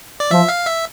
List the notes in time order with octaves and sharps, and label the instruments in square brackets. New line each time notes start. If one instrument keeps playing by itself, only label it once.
[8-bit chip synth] D5
[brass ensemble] F3 [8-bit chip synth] E5
[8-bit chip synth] F5
E5